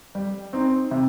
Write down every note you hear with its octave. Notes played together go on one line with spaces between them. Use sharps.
G3
C4 D#4
C3